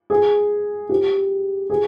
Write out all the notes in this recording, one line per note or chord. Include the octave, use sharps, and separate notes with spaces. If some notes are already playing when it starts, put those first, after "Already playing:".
G#4
G4
G#4